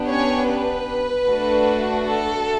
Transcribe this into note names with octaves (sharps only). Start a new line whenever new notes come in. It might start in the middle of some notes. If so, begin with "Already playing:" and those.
Already playing: B3 D4 G4
C#4 C#5
B4
A3 D4 F#4 A4
A4